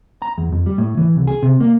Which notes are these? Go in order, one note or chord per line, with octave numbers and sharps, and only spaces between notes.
A#5
E2
F2
G3
A2
E3
C2
G#4
C3
A#3